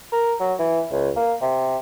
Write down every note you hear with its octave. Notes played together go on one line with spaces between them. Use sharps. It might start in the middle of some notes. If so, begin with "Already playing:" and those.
A#4
F#3
E3
C#2
A#3
C3